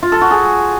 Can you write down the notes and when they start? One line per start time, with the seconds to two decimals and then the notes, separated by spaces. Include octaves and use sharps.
0.03 F4
0.12 A4
0.21 F#4
0.31 G#4